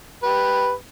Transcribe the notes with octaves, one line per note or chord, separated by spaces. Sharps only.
G4 B4